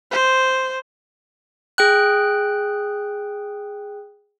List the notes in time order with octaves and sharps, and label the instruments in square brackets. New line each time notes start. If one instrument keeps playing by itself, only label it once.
[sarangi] C5
[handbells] G#4 G5 F#6